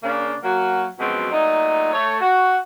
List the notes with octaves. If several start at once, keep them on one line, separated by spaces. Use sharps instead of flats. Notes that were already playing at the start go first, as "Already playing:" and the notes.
C#3 A#3 D4
F#3 A#3 F#4
F#2 B2 F3 F#3 G#3 C4
A#2 F#3 A3 D#4
A3 C#5
F#4